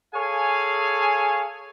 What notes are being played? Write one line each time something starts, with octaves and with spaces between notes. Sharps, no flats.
G#4 A4 C#5 F5 G#5